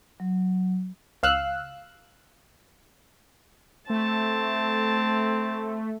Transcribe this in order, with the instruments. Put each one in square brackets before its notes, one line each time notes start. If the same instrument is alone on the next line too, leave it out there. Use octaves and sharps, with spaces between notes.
[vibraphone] F#3
[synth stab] C#2 F5 E6 F#6
[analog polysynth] A3 [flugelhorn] C4 [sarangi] A5